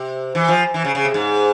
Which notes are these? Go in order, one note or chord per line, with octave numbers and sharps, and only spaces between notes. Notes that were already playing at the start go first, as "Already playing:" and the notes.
Already playing: C3
E3
F3
E3
C#3
C#3
C3
G#2